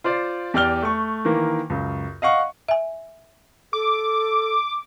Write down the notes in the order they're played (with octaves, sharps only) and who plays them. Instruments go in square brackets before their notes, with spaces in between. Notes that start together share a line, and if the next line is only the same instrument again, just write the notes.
[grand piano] F4 C5 D5 F5
E2 G4 D5 F6 G7
A3 C#6
D#3 E3 A#3
C#2 F#2
D#5 F5 F#5 C#6
[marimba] E5 G#5
[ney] A4 [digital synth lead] D6